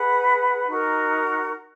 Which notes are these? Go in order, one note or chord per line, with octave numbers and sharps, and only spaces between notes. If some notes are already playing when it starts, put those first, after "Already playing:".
Already playing: G#4 B4 F#5 B5
D#4 F#4 A#4